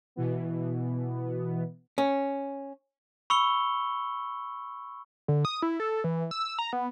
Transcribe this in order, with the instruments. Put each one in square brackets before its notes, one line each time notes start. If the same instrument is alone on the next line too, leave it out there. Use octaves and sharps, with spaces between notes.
[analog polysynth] B2 E3 B3
[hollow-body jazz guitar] C#4
[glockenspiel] B5 C#6 E6 C#7 F7 G7
[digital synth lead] D3
D#6
E4
A4
E3
E6
A#5
B3